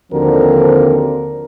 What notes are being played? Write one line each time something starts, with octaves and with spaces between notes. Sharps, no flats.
D#2 D3 F3 C4 F#4 A#4